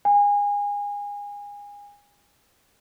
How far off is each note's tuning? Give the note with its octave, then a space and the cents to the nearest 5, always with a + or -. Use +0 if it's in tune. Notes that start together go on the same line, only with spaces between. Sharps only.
G#5 -30